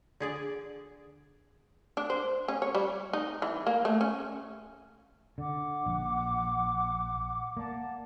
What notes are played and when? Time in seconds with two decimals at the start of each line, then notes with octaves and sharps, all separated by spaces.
0.20 D3 G#4 D5
1.97 D4
2.10 C5
2.48 C#4
2.62 C#5
2.75 G3
3.13 D#4
3.42 E3
3.67 A#3
3.85 A3
4.01 C#4
5.38 D3 F#5 D6
5.86 A#1
7.57 A#3 D5 F#5 A5